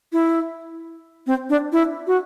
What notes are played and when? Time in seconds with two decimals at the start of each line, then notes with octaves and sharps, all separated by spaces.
0.13 E4
1.27 C4
1.50 D4
1.72 E4
2.07 F#4